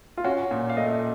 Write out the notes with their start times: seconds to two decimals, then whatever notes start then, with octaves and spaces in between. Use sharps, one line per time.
0.17 F4
0.24 C#4 F#4
0.51 A#2
0.69 F5
0.77 A3 D#5